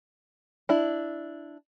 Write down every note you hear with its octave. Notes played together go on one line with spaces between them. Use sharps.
D4 E4